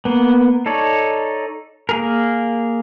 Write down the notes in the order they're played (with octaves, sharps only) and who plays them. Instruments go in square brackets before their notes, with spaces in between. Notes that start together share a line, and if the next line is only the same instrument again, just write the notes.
[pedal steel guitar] A#3 B3
D#4 A4 C#5 D5
A#3 G#4 A#4